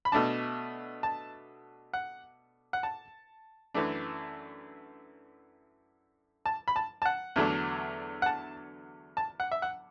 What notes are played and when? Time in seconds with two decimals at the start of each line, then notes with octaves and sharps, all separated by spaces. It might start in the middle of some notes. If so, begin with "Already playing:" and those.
0.05 B5
0.12 B2 A3 D4 A5
1.03 A5
1.94 F#5
2.73 F#5
2.83 A5
3.74 F#2 E3 A3 D4
6.46 A5
6.68 B5
6.76 A5
7.02 A5
7.05 F#5
7.36 E2 D3 F#3 A3 D4
8.22 F#5
8.26 A5
9.17 A5
9.40 F#5
9.52 E5
9.62 F#5